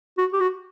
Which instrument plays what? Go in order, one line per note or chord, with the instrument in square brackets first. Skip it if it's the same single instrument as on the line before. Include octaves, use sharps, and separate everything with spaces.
[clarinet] F#4
G4
F#4